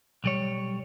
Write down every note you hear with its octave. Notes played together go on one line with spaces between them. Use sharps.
B1 G3 C#5